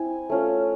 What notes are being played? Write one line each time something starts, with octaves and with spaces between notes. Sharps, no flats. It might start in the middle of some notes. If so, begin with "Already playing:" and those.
Already playing: C4 E4 G#5
A3 C#4 F4